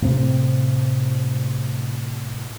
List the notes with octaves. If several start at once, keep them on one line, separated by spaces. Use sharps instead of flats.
A2 C3 C4